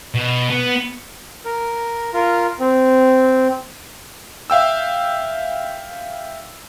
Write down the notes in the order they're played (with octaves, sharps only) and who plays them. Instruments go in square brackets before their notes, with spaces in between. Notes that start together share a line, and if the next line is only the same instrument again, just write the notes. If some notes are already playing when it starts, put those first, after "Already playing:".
[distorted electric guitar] B2
B3
[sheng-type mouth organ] A#4
F4 A#4
C4
[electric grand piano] E5 F5 G5 E6